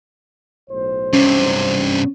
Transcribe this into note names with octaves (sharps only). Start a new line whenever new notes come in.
B1 A2 C5
G2 C3 C#4